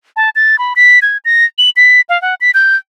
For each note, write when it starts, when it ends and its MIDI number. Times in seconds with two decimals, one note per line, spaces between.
0.16 0.30 81
0.35 0.58 93
0.59 0.73 83
0.76 0.99 95
1.02 1.17 92
1.25 1.45 94
1.58 1.70 102
1.76 2.01 95
2.09 2.20 77
2.22 2.35 78
2.41 2.51 95
2.54 2.76 91